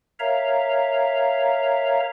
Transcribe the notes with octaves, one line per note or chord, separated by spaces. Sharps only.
A#4 C#5 E5 F5 A#5